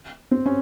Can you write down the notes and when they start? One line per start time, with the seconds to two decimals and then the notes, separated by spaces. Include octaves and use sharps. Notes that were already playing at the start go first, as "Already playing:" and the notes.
0.31 C4
0.46 C#4